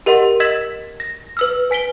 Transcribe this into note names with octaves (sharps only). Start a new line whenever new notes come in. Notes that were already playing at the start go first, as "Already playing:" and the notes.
G4 A#4 D#5 F#5 C6
D#5 E6 G#6 B6 E7 F#7
A#6
B4 E6 F6
B4 G#5 B6 D7 G7